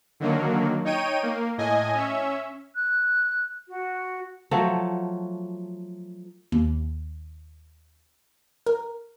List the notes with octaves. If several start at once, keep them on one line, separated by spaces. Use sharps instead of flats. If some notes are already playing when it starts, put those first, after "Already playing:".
D3 D#3 F#3 A#3
D#4 C#5 G5 D#7
A#3
A2 D#5 G#5
C#4 E5
F#6
F#4
F3 F#3 A3
D#2
A#4